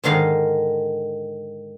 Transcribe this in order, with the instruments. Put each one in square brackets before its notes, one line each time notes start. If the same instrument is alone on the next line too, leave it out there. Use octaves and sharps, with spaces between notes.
[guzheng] G#2 D3 D#3 F5